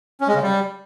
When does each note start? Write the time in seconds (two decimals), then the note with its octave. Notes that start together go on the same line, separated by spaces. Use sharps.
0.21 C#4
0.28 G#3
0.35 C#3
0.42 G3